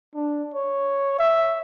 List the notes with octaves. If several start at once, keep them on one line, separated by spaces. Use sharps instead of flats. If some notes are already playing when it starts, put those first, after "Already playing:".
D4
C#5
E5